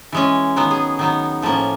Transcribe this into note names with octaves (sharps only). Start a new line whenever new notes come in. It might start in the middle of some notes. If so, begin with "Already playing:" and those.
E3 G#3 C#4
D#3 F#3 B3
G#4
D#3 F#3 B3
A2 F3 A#3 C#4